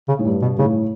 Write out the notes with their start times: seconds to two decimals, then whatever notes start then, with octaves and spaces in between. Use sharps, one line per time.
0.08 C#3
0.19 A2
0.25 G2
0.42 B2
0.58 A2 C#3